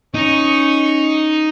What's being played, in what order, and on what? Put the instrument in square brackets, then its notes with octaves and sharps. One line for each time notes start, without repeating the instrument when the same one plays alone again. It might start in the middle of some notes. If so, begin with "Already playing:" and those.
[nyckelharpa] C#4 C#6 [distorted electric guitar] D#4